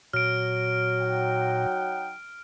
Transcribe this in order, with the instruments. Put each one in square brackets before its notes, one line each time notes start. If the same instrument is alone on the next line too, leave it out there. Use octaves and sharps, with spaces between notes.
[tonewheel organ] A#2 [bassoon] F#3 [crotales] F6 D7
[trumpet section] D#4 F#5 G5